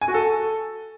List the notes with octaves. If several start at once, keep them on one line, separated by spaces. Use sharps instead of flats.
G#5
F#4
A4